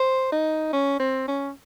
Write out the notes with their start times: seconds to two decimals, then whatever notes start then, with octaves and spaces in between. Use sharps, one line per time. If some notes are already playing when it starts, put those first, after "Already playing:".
Already playing: C5
0.32 D#4
0.73 C#4
1.00 C4
1.28 C#4